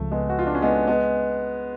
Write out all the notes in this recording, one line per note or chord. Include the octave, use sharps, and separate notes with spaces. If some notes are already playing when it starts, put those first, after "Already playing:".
Already playing: C#2 C#3 F3 A3
G#3 B3
F#4
F4
D4
C#4
G#3 B3
G#3 B3